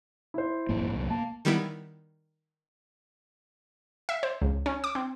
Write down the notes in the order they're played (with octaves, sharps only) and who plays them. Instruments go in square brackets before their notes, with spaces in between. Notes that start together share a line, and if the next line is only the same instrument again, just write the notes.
[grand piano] E4 C5
[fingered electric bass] A1 F#2 A#3
C2 F#2 A#2
[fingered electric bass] A#3 [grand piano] A5
[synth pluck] D#3 G3 B3 E4
[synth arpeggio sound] E5
C5
C#2
C#4
D6
C4